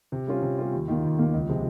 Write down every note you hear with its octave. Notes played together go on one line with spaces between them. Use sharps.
C3
G3 C#4 F4
C3
G3 C#4 F4
D#2
D#3 A#3 F4
D#2
D#3 A#3 F4
C#2
C3 F3 G#3